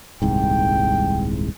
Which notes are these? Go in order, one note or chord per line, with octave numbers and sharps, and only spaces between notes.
D#1 C2 G#2 G5